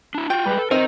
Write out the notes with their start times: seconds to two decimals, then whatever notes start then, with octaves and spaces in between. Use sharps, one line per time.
0.15 D4 E4
0.30 F4 F#4 G5
0.46 G3 G#3 B4
0.58 A4
0.71 C4 D#4 A#4 D#5